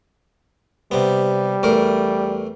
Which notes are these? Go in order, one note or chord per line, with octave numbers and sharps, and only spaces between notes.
C3 G3 B3
E2 A3 A#4